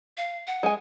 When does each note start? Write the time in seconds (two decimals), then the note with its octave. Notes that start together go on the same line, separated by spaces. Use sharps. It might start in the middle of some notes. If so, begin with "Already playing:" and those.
0.17 F5
0.47 F#5
0.63 G#3 G#5